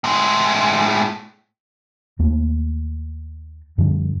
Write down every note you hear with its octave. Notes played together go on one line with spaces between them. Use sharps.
A2 G#3
D#2 A3 A#3
F#2 D3 F3 G3